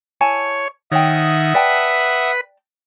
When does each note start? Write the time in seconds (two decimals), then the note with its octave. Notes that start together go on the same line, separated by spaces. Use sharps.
0.21 E4 C#5 G#5 A5
0.92 D#3 C#5 E5 F#5 G5 D#6
1.54 B4 D5 G5 A5